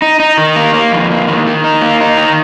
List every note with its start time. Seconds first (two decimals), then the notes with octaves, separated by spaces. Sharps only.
0.02 D#4
0.20 D#4
0.38 D#3
0.56 A#3
0.74 A#3
0.93 F2
1.11 A#3
1.28 D#3
1.47 D#3
1.64 D#4
1.82 A#3
2.00 D#4
2.17 D#3